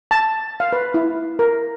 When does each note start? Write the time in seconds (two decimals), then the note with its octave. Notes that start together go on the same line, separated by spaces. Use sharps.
0.11 A5
0.60 F5
0.73 B4
0.94 E4
1.39 A#4